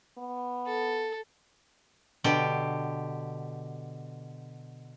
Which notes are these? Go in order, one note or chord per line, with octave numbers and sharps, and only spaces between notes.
B3
A4
B2 D3 G4